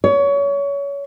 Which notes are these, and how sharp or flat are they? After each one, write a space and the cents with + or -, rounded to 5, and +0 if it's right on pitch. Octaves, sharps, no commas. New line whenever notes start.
C#5 +25